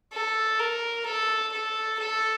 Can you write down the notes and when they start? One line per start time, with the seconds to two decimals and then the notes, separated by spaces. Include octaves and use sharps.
0.13 A4
0.59 A#4
1.06 A4
1.52 A4
1.99 A4